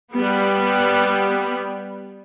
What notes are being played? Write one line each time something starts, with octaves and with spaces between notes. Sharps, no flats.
G3 B3